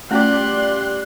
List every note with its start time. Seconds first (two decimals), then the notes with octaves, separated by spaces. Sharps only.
0.11 G3 A3 C#4 F4 G4 D5 C6 F#6